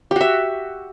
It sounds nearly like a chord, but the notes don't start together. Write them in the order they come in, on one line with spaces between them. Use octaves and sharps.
G4 F#4 E5